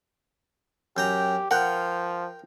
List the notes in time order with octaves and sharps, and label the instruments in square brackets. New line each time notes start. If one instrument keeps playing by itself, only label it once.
[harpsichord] F#2 G5 A#5 [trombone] G4
[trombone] F3 [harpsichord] A#4 G5 [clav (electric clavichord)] F#5